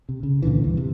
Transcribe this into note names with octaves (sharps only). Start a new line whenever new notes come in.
C3
C#3
D2 A#2 D3 E3
G2 E3
C3